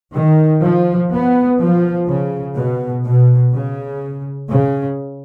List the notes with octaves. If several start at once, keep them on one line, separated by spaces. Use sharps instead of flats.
D#3
F3
B3
F3
C#3
B2
B2
C#3
C#3